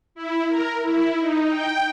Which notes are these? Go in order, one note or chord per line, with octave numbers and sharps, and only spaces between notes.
E4
A#4
E4
D#4
G5